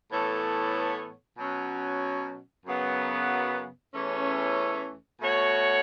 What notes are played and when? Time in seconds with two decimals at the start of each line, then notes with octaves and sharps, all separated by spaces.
0.11 A2 E3 B3 A4 C#5
1.38 B2 F#3 C#4
2.65 F#2 C#3 F#3 B3
3.93 E2 E3 A3 C#4
5.21 B2 A3 F#4 C#5